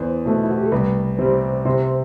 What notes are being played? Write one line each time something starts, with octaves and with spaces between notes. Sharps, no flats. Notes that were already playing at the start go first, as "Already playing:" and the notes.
Already playing: E2 C5
B2 A3
E4
F#4
G4
A4
C2 B4
C3 G3 C5
C3 C5